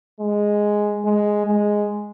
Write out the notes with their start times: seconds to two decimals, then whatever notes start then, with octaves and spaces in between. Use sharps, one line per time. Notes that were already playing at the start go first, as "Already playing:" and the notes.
0.20 G#3
1.05 G#3
1.47 G#3